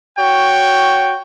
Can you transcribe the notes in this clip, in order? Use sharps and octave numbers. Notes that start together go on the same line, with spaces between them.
F#4 C#5 G5